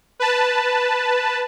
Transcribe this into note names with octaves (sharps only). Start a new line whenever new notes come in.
B4 A5